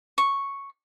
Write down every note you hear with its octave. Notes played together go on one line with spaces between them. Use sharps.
C#6